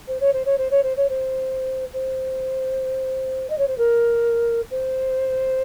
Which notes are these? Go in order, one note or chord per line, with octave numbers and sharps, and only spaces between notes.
C5
C#5
C5
C#5
C5
C#5
C5
C#5
C5
C5
D#5
C#5
C5
A#4
C5